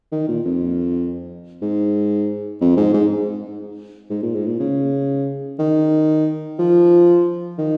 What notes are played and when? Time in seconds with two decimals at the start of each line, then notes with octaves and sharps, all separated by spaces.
0.12 D#3
0.28 A#2
0.45 F2
1.62 G#2
2.61 F2
2.77 G#2
2.94 G#2
4.10 G#2
4.23 A#2
4.35 G#2
4.47 A#2
4.60 C#3
5.59 D#3
6.59 F3
7.59 D#3